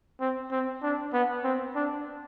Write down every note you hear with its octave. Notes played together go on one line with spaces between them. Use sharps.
C4
C4
D4
B3
C4
D4